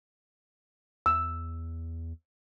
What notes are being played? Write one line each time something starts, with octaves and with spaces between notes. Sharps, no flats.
E2 E6